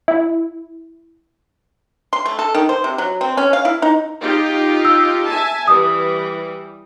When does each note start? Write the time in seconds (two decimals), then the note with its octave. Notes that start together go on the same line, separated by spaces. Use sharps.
0.08 E4
2.13 C6
2.26 A3
2.39 A4
2.55 D#3
2.69 C5
2.84 C3
2.98 F#3
3.21 C4
3.37 C#4
3.53 F5
3.65 E4
3.82 D#4
4.21 D#4 F4 G4
4.85 E6
5.27 E5 G#5 A5
5.68 E3 G3 D#6